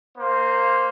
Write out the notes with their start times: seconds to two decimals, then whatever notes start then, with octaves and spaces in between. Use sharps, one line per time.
0.18 A#3 C5